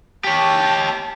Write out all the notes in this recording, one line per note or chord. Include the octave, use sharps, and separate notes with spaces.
G4 C#5 A5